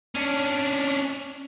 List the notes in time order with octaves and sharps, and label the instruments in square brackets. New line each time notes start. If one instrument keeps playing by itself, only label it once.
[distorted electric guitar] C#4 D4